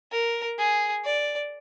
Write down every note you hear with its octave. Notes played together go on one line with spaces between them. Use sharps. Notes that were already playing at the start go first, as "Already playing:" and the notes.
A#4
G#4
D5